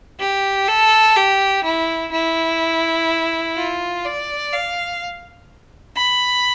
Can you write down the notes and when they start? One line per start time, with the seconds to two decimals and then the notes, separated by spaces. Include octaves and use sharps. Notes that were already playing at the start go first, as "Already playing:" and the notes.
0.19 G4
0.68 A4
1.16 G4
1.64 E4
2.12 E4
3.56 F4
4.05 D5
4.53 F5
5.97 B5